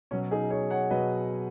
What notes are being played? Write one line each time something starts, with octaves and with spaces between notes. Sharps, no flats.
B2 F#3 C#4
D#4 G#4
G#4 C#5
C#5 F#5
B2 F#3 B4 D#5